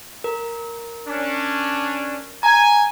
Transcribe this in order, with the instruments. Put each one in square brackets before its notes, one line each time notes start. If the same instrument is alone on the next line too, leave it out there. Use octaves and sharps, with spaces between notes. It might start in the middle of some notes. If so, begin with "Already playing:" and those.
[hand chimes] A#4
[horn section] C#4 D4
[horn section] G#5 [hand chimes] A#5